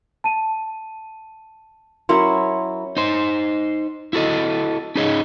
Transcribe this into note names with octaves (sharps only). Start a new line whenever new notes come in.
A5 D#7
F#3 C#4 E4 A#4 C6
D#4 C5
E4 F#4 A4 D#5
C#4 D#4 G#4 C#5 D#5